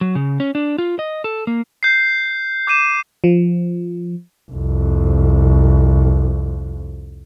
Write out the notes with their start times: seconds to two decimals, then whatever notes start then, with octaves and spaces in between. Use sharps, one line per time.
0.01 F#3
0.15 C#3
0.40 C#4
0.55 D4
0.78 F4
0.99 D#5
1.24 A4
1.47 A#3
1.83 G6 C7
2.67 D6 G6 D#7 E7
3.24 F3
4.51 C2 F2